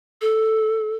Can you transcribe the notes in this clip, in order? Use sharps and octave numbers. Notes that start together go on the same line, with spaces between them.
A4